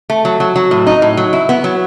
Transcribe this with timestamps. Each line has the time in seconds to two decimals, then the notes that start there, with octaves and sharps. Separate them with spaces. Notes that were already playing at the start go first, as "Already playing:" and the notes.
0.10 A3
0.25 F#3
0.40 F#3
0.56 F#3
0.71 A2
0.87 D#4
1.02 A2
1.17 F#3
1.33 E4
1.49 B3
1.64 F#3